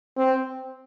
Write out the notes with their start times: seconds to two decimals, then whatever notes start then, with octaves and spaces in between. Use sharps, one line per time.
0.18 C4